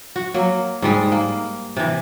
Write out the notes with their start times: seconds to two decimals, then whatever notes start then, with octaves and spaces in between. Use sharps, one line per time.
0.16 F#4
0.34 F#3 A#3
0.82 G#2 G3 G#3
1.12 A#3
1.77 C3 E3